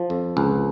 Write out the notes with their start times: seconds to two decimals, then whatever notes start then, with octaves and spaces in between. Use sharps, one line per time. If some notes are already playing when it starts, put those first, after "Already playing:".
Already playing: F3
0.10 F2
0.37 C#2